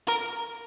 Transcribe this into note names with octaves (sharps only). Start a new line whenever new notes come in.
A#4